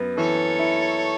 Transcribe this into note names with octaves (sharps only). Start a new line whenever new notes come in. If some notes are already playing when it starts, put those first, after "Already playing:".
Already playing: F#2 B3
E3 A4 C#5
E4